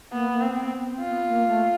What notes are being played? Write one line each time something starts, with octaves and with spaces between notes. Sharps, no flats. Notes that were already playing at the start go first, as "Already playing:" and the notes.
A#3 B3
A#3
C4
B3
B3
C4
F4
B3
A#3
A3